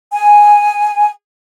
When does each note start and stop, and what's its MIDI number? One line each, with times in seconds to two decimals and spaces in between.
0.12 1.10 80